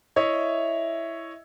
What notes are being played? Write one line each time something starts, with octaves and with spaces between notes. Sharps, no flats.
E4 C#5 D#5 E5